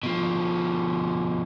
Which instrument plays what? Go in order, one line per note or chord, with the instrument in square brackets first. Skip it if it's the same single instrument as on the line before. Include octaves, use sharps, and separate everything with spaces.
[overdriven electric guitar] B2 F3